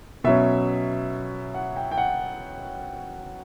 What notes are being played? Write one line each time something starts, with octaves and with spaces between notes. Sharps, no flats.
B2 F#3 C#4 E5
F#5
G5
G5
F#5